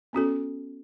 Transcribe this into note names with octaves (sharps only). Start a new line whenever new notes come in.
B3 C#4 F#4 A4